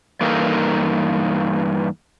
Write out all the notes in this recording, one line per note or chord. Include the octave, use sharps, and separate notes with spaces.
G2 E3 A#3 D#4 A4 A#4